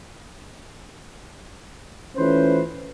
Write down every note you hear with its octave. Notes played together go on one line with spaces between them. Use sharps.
E3 A3 C#4 F4 B4 C5